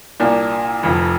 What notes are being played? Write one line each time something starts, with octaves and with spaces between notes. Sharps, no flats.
C2 A#2 A#3 D4
F1 F2 F3